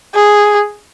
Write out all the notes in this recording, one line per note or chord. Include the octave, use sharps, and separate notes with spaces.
G#4